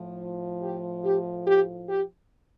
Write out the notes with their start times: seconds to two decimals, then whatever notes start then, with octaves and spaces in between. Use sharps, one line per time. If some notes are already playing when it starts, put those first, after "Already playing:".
Already playing: A2 F3
0.62 G4
1.04 G4
1.47 G4
1.89 G4